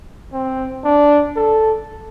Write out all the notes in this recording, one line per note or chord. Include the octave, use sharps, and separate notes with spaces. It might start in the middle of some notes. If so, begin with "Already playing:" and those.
C4
D4
A4